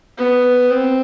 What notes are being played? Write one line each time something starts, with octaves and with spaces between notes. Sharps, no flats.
B3
C4